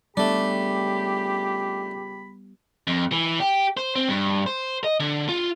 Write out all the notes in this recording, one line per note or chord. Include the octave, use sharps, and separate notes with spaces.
C#2 G3 A3 B3 D4 G4 B5
F2
E3
G4
C5
C4
G2
C5
D#5
D3
F4